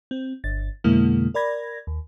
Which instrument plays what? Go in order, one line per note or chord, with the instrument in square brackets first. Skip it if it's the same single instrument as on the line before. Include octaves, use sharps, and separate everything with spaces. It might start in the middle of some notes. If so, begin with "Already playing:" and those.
[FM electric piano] C4
G1 A6
F2 B2 D3 G#3 A#3 E4
A#4 D5 B5 G#6 A#6
D#2